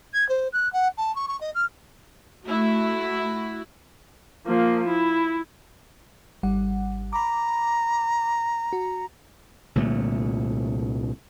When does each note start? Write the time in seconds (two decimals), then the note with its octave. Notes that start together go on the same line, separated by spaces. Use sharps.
0.14 G#6
0.29 C5
0.53 F#6
0.73 F#5
0.97 A5
1.15 C#6
1.28 C#6
1.41 D#5
1.55 F6
2.47 A3 E4 F#4
4.46 F3 A#3
4.88 E4
6.43 G#1 G3 F#5
7.13 A#5 B5 D6
8.73 F#4
9.76 C2 A#2 D3 A3